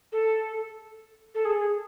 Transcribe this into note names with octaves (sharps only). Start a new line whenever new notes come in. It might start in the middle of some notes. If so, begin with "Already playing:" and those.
A4
A4
G#4